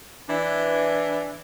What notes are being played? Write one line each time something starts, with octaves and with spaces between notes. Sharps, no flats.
E3 D4